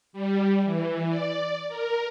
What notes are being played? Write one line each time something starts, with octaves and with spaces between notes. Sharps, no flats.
G3
E3
D5
A#4